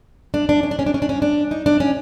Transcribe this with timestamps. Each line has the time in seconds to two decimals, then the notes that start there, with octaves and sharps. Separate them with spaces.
0.34 D4
0.49 D4
0.63 C#4
0.71 D4
0.79 C#4
0.86 D4
0.94 C#4
1.02 D4
1.09 C#4
1.22 D4
1.51 D#4
1.66 D4
1.80 C#4